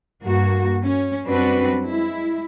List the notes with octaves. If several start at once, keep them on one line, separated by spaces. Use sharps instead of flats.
G2 A#3 F#4
C#4
F#2 G3 C4 D4 F#4 B4
G#3 E4